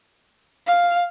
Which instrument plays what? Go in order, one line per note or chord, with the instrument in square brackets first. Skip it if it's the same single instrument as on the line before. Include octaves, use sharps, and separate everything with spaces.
[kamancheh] F5